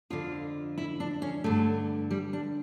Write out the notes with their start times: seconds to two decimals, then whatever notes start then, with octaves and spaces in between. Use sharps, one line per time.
0.10 F2 D3 F4
0.78 E4
1.00 D4
1.22 C#4
1.44 G2 D3 A3
2.11 G3
2.33 D4